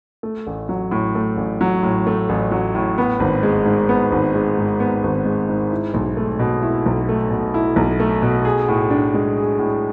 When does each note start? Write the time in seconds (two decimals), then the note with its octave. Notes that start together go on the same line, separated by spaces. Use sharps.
0.23 A3
0.47 A1
0.69 F#3
0.91 A2
1.15 A3
1.37 A1
1.61 F#3
1.83 A2
2.07 A3
2.29 A1
2.52 F#3
2.75 A2
2.98 B3
3.20 G#1
3.43 G#3
3.66 G#2
3.89 B3
4.12 G#1
4.34 G#3
4.58 G#2
4.80 B3
5.03 G#1
5.25 G#3
5.49 G#2
5.71 E4
5.94 B1
6.17 A3
6.39 B2
6.62 E4
6.86 B1
7.09 A3
7.31 B2
7.54 E4
7.76 B1
8.00 A3
8.22 B2
8.45 G#4
8.68 A2
8.90 D4
9.14 G#3
9.37 G#4
9.59 A2